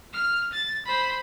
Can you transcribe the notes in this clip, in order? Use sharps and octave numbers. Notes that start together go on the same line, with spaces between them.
F6
A6
C5 B5